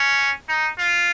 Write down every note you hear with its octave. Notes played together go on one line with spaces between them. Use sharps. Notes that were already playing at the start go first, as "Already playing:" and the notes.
Already playing: C#4
D#4
F4